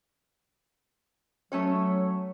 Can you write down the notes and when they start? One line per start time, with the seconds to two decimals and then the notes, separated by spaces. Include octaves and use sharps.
1.52 F#3 A3 C#4 C#5